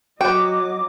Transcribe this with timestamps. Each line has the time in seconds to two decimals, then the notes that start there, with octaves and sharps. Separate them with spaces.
0.21 F#3 F#4 D#5 G5 D6